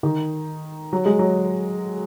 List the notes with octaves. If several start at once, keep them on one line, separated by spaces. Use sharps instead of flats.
D#3
F#3
G#3
F#3